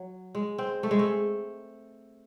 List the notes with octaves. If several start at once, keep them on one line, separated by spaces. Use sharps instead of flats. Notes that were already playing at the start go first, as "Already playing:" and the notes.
Already playing: F#3
G#3
C4
A3
G#3
A3